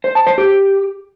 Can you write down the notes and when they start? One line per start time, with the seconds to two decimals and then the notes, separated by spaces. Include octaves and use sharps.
0.04 C5
0.15 A5
0.27 C5
0.38 G4